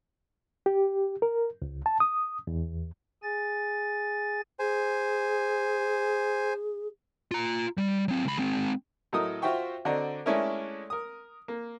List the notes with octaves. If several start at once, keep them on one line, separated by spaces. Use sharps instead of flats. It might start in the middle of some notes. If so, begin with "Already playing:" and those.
G4
A#4
C#2
A5
D#6
E2
G#4 G#5 A6
G#4 C5 G#5
F4 A#5
G3
F#3 C4
C#2 B5
G#3 C4
A2 F#3 A4 A#4 D#5 D#6
F4 F#4 C5 E5 G5 C#6
D3 C4 F#4 D5 D#5 A#5
G#3 A3 C#4 D4 E4 A#4
A#4 D#6
A#3